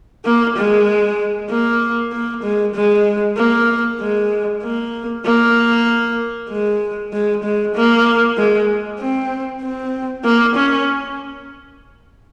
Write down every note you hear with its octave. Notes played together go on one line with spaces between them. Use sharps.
A#3
G#3
A#3
A#3
G#3
G#3
A#3
G#3
A#3
A#3
G#3
G#3
G#3
A#3
G#3
C4
C4
A#3
C#4